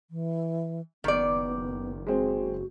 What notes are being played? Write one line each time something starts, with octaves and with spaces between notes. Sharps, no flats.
E3
F#1 D#3 B3 D5
G#3 C4 F#4